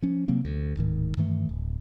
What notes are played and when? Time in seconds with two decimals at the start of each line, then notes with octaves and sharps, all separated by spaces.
0.02 F3 C#4
0.28 C3 F#3 A#3 C4
0.45 D2
0.77 D1 G#2 D#3
1.17 G2 D#3 E3 A3
1.49 D1